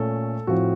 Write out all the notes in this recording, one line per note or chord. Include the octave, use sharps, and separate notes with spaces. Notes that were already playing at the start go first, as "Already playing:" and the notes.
Already playing: A#2 A3 C#4 A4
A2 F3 C4 F#4